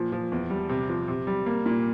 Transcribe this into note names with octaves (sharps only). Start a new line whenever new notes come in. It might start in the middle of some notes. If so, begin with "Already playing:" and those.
Already playing: A#2 F3
F3
E2
G3
C3
F3
C3
G3
A#3
A#2